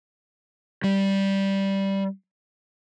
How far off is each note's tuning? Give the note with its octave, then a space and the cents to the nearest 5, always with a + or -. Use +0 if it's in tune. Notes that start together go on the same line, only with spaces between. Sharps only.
G3 -5